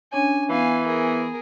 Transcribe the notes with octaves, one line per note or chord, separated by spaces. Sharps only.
C#4 D4 C#5 G#5
E3 B3 F5 G#5
G#4 A#4